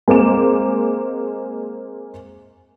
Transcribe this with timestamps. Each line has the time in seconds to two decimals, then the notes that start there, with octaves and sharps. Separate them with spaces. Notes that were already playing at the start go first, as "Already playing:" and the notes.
0.08 G#3 A#3 C4 D6 E7